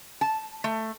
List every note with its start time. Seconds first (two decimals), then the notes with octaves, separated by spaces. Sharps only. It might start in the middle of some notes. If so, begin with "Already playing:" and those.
0.21 A5
0.64 A3